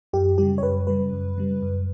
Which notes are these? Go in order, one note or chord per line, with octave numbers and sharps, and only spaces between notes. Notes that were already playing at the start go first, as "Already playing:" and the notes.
F#2 G4
C#3 G3 G4
C#5
F#2 B4
C#3 G3 B4
F#2
C#3 G3
F#2